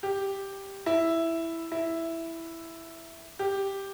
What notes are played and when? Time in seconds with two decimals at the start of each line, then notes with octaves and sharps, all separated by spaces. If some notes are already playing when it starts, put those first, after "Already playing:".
0.03 G4
0.86 E4
1.72 E4
3.39 G4